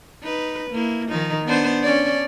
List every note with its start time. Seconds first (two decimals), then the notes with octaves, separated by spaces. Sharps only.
0.23 D#4 B4
0.71 A#3 E4
1.09 D#3 F3 D#4
1.45 B3 D4 C5
1.82 C#4 D4 D5